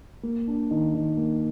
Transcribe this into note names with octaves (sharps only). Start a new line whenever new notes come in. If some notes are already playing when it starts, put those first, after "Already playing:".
A#3
D4
D#3
D#3
A#3